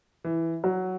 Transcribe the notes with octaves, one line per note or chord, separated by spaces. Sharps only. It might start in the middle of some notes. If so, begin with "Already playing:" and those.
E3
F#3